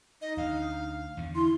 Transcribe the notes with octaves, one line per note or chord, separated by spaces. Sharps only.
D#4 D#5
D2 F5
E2 D3
E4 C6